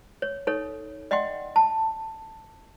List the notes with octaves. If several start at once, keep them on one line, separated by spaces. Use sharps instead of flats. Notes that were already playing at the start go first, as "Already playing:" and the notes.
C#5
D#4 A4 C#5
D5 D#5 F#5 G5 C6
A5